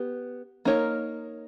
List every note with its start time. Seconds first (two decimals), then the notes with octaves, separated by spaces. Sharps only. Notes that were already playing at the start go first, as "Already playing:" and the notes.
Already playing: B3 G4
0.65 A#3 D#4 A#4 C#5